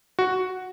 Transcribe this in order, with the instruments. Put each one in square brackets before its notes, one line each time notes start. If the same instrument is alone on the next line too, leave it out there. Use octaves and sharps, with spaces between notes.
[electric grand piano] F#4